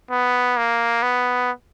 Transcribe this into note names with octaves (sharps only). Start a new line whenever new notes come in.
B3
A#3
B3